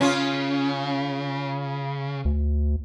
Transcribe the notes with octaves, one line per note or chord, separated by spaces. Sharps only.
C#3 C#4 F4
D2